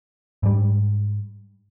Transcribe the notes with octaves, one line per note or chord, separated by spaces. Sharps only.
G#2 G3